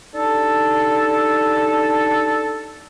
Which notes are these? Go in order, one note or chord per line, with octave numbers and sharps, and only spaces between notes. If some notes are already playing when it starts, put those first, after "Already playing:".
D4 D#4 G4 A4